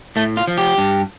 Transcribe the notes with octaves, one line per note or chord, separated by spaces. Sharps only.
A2 A3
F4
F3
G4
G2